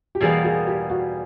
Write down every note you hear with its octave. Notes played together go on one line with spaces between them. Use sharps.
G4
E2 B2 G3 A#3 G#4
G#4
G4
F#4